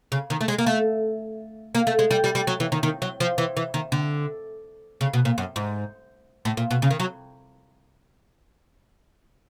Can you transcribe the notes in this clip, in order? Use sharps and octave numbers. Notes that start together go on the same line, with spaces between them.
C#3
D#3
A3
G#3
A#3
A3
A#3
A3
G#3
G3
G3
G3
F#3
E3
D#3
D#3
F#3
F3
E3
E3
D#3
D3
C#3
B2
A#2
F#2
G#2
A2
A#2
B2
C#3
D#3
F#3